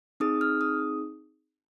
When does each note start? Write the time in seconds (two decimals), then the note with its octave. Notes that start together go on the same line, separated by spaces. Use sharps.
0.20 C4 D#4 G#4 D#6
0.41 F6
0.61 D#6